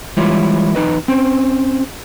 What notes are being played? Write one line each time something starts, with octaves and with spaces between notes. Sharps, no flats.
E3 G3 G#3 E4 F4 C#5
E2 D#4 B4 D#5
C4 C#4 C5